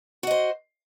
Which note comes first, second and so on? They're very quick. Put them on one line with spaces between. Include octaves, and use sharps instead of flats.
F#4 D#5 C5